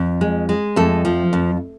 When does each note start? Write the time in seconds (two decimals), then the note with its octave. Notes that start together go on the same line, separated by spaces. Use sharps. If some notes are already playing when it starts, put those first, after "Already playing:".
Already playing: F2
0.21 G#3
0.49 G#3
0.76 F2 A3 A4
1.05 F3
1.33 F2